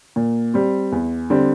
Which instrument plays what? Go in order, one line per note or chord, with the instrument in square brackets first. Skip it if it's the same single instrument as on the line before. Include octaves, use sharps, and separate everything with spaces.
[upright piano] A#2
G3 C4
E2
D3 G3 C4